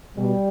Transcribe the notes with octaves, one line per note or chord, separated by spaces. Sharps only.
B2 G3